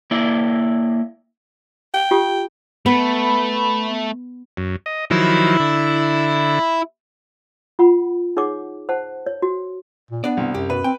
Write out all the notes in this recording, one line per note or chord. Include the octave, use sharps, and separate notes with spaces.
A#3 E4 D5
G5
F4 G4 D#6
A3 B3 B5
F#2
D#5
D#3 F3 F#3 E4
D3
F4 F#5 B5
D#4 G#4 C#5 F#5 D6
C5 F#5 A5
C#5
F#4
A#2
B3 D4 B4 D5
C2
F#2 G4
B2 B4
C4 G5